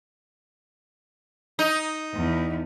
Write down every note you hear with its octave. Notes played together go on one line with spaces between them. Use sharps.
D#4
E2